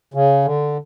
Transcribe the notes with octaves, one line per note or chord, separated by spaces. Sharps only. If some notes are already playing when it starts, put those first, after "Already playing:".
C#3
D3